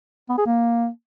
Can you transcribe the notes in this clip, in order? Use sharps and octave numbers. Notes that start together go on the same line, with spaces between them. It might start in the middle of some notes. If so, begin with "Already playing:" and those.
B3
G#4
A#3